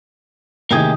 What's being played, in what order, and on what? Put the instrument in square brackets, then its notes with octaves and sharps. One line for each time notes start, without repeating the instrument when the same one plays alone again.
[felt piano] A1 C3 D#3 [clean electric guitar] A#3 G4 G#4